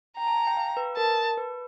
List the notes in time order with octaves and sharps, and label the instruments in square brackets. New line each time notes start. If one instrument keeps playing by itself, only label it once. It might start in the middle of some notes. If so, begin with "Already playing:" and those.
[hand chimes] G5 [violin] A#5
[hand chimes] A5
G#5
G5
F5
B4
[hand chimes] A#4 [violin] A5
[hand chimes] B4